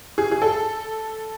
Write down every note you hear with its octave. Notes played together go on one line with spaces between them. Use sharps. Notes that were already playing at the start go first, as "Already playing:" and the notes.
G#4
G#4
A4